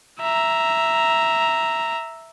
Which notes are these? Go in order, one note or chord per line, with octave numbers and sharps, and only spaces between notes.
E5 A#5